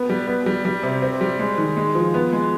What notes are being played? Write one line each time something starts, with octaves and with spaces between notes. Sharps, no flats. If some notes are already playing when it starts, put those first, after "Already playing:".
Already playing: B3
G3
B3
G3
G3
C3
C4
G3
G#3
D#3
G#3
F3
B3
G#3